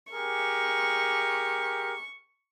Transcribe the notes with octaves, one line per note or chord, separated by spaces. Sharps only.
G4 G#4 A#4 C#6